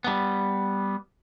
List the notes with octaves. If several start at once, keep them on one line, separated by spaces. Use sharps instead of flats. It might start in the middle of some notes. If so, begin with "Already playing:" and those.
G3 B3